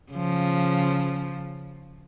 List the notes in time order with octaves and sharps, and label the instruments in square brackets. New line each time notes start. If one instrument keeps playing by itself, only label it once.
[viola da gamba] C#3 F3